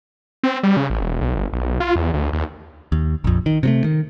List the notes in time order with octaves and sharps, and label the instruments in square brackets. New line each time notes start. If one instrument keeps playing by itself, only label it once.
[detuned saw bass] C4
G3
C#3
A1
E1
B1
G1
B1
F4
E2
D2
D#2
[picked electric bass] D#2
A#1 F2
D#3
C3 F#3 A3
D#3